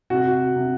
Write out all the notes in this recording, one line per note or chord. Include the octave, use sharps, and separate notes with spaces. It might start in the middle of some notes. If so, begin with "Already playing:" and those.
C3 F#4
C3